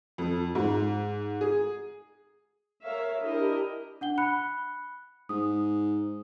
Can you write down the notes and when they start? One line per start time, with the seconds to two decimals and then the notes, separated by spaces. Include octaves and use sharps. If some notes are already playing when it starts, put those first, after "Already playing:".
0.18 F2
0.55 G#2
1.41 G#4
2.82 A#4 C#5 E5 F5
3.23 D4 E4 G4 A#4 D#5
4.01 D4 F#5 G7
4.18 B5 F#6 C#7
5.29 G#2 D#6